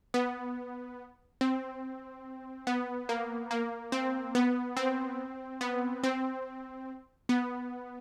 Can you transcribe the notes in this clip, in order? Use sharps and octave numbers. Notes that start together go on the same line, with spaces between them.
B3
C4
B3
A#3
A#3
C4
B3
C4
B3
C4
B3